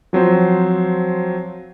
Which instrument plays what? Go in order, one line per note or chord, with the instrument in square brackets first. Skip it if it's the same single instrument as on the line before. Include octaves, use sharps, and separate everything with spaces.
[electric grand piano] F3 F#3 C4 C5